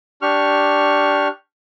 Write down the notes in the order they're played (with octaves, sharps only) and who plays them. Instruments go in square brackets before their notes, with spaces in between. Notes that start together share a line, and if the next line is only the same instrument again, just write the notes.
[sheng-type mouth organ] D4 G4 C#6 F6